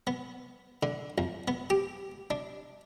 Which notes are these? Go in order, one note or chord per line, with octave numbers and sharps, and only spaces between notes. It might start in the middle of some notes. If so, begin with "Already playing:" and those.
B3
D3
F2
B3
G4
D4